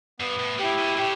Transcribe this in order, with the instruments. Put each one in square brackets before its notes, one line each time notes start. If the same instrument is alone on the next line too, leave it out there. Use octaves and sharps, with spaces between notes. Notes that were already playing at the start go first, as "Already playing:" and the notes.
[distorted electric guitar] G2 [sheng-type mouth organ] B3
[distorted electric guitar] A2
[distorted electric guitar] A2 [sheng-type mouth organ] E4 G4
[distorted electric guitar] B2
[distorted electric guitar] A2 [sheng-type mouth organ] G4